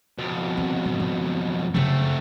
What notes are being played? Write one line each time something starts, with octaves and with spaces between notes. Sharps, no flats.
F2 B2
C4
G#2 F#3
F#3
F#2 C#3 A3 C4